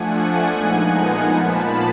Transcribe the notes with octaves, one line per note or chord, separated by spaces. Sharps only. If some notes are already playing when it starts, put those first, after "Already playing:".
Already playing: F3 A3 D4 F#5 G#5
A#2 F3 G#3 B3 D#4
A#2 F3 A#3 A5 B5